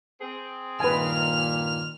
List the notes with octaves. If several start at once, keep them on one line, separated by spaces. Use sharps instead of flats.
C4 G#4
G2 A#2 D#3 B4 G#5 F6